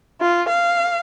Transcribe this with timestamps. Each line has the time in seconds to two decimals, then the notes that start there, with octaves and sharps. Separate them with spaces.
0.20 F4
0.49 F5